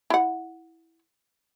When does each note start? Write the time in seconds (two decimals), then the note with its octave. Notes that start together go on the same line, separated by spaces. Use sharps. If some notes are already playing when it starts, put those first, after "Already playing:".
0.10 E4 F#5